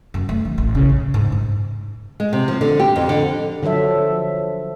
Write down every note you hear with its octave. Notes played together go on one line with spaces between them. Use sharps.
F#2
A3
E3
A1
C#3
E2
G#2
G#2
G#3
C3
F3
D3
G4
F2
D3
D3 F3 F#3 A4 E5